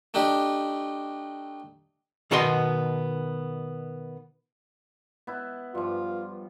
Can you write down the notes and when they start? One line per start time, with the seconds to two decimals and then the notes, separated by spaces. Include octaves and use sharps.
0.14 A3 D4 D#4 G4
2.31 B2 D#3 B3 F#4 D#5 C6
5.27 B3 E4
5.75 G2 F3 F4